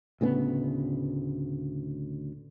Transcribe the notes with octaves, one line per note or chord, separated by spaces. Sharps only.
D2 A2 C#3 B3